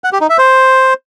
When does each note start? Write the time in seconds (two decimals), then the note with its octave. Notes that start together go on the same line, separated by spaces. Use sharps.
0.04 F#5
0.13 G4
0.21 D#4
0.29 E5
0.38 C5